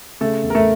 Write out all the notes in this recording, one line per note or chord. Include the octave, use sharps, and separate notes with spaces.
C#3 A3 A4
E2
A#4
A3 A4